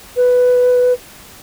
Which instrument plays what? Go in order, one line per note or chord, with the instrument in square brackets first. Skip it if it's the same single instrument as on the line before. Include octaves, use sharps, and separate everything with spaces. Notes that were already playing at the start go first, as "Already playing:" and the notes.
[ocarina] B4